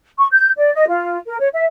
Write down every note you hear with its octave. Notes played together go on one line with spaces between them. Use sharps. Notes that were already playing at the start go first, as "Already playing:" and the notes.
C#6
G6
D5
D#5
F4
A#4
C#5
E5